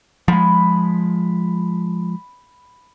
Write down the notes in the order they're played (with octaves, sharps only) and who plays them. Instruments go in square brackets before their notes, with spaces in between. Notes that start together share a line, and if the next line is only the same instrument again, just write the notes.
[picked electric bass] F3 G#3 [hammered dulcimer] B5